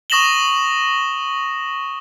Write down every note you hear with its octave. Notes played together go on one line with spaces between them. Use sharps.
C#6 D#6 A#6 E7 F#7 G7